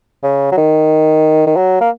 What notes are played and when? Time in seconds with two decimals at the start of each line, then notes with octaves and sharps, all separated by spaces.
0.23 C#3
0.51 F#3
0.57 D#3
1.47 D#3
1.56 F#3
1.80 A#3